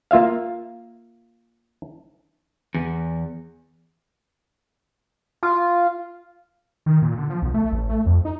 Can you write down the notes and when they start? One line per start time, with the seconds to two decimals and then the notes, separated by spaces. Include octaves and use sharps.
0.11 A#3 F4 E5 F5
2.74 E2
5.43 F4
6.86 D#3
7.02 A#2
7.18 D3
7.30 F3
7.42 B1
7.54 A3
7.72 A1
7.89 A3
8.06 F2
8.25 D#4